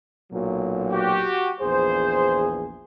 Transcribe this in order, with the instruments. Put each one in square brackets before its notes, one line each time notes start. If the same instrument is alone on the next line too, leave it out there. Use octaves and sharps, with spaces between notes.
[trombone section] B1 A#2 F#3
[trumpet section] F#4 G4
[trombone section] A#1 E2 G#4 [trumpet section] C5